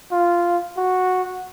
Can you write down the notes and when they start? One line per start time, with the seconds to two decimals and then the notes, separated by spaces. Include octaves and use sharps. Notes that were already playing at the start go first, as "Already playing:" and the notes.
0.12 F4
0.77 F#4